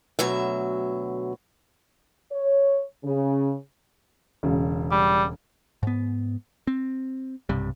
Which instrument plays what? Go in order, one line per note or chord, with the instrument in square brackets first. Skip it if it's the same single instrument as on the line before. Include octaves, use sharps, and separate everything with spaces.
[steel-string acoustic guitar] D2 B2 F#3 E5
[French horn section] C#5
C#3
[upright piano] E1 C#3
[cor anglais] G3
[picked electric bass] G#2 B3
C4
B1 G2 C3 G3